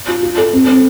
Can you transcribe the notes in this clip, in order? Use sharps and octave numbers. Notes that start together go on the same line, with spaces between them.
F4
F4
A4
C4
C4